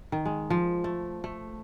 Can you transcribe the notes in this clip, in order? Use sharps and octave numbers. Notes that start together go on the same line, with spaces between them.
D#3
G#3
F3
A3
A3